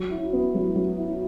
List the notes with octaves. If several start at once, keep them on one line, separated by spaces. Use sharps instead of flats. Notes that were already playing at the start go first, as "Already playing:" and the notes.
Already playing: F#3
E4
B3
F#3
F#3
E4